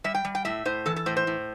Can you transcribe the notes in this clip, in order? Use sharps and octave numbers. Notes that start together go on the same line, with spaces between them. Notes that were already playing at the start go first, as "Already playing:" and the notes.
G3 E5
G5
G3
G5
A2 E5
A2 C5
E3 A4
A4
A2 C5
C5
A2